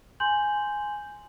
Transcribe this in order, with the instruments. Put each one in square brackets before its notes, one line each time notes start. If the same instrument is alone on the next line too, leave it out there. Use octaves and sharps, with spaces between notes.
[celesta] G#5 C6 G6 F#7